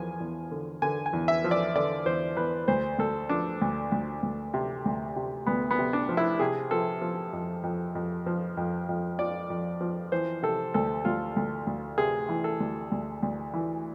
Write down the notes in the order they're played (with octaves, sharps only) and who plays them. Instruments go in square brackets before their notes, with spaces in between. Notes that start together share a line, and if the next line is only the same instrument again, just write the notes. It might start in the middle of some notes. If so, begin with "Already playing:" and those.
Already playing: [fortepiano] E2 F3 G#5
E2
D3
D3 G#5
G#5
E2
E5
F3
D5
D3 D5
E2 C5
E2 B4
D2 C5
D2 A4
F3 D4
D2
D2
D2
C3
D2
C3
D2 B3
B3
C3
D4
F3
E4
C3 G#4
F3 A4
F3
F2
F2
F2
F3
F2
F2
F3 D5
F2
F3
E3 C5
C3 A4
D2 A4
D2 F4
D2
D2
C3 G#4
E3
A4
D2
D2
D2
E3